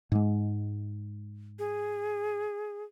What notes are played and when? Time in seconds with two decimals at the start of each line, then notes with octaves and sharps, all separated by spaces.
0.12 G#2 G#3
1.59 G#4